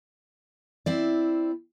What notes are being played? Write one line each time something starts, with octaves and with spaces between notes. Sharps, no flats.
C4 E4 D5